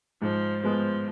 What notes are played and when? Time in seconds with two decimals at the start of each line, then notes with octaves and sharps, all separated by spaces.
0.22 G#2 F3
0.63 F3 G#3 B3